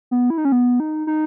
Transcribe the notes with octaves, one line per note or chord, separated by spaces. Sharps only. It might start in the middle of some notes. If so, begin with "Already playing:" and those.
B3
E4
D#4
C#4
B3
D#4
D#4